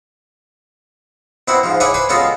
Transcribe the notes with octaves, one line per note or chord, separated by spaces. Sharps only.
B2 C4 E4 F#5
G#2 F3
E4 G#4 C#5 F#5 G#5 D6
B4 C5 G#5
G#3 B3 C#4 F4 F#4 A4